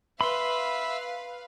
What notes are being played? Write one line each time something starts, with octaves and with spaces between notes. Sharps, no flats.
B4 E5 F5 B5 C6